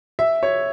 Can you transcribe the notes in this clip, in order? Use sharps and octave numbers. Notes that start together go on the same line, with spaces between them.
E5
C#5